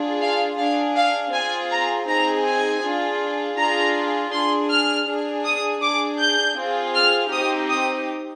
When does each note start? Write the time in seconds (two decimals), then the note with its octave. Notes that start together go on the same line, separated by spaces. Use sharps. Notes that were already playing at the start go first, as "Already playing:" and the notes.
Already playing: D4 F4 G#4
0.21 F5
0.59 D4 G#4 F5
0.96 F5
1.33 C4 F4 G#4 G#5
1.71 A#5
2.08 C4 D#4 G#4 A#5
2.46 G#5
2.83 D4 F4 G#4
3.58 D4 F4 G#4 A#5
4.32 D4 G#4 C6
4.70 F6
5.07 D4 G#4
5.45 D#6
5.82 D4 G#4 D6
6.19 G6
6.57 C4 F4 G#4
6.95 F6
7.32 C4 D#4 G4 D#6
7.69 D#6